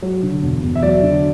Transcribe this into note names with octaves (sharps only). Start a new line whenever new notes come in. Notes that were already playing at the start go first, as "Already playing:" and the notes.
F#3
D3
E1
E2
E5
F#3 D5
D3